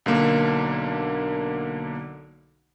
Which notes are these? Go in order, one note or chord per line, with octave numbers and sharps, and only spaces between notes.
B1 D3 A#3